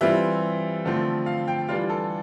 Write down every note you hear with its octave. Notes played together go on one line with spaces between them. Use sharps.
E3 G3 C4 F4 E5
D3 F3 A3 C4 F4
F5
G5
E3 G3 D4 F4 F5
A4